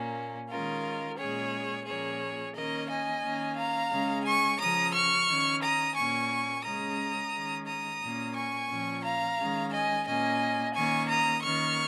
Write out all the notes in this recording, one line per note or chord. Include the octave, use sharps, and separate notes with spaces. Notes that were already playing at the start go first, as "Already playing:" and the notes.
Already playing: A#2 A#3 C#4
D#3 G#3 C#4 F4 A#4
A#2 G#3 C#4 G#4 C#5
A#2 F3 A#3 C#4 G#4 C#5
D#3 A#3 C#4 A#4 D#5
D#5 G#5
D#3 A#3 C#4
F5 A#5
C#3 G#3 C#4
G#5 C#6
C#3 F3 C#4 A#5 D#6
C#6 F6
D#3 C#4
A#5 D#6
A#2 A#3 C#4 G#5 C#6
C#3 G#3 C#4 A#5 D#6
D#3 G#3 C#4
A#5 D#6
A#2 A#3 C#4
G#5 C#6
A#2 F3 C#4
F5 A#5
D#3 G#3 C#4
D#5 G#5
A#2 A#3 C#4 D#5 G#5
D#3 A#3 C#4 G#5 C#6
A#5 D#6
D#3 A#3 C#4 C#6 F6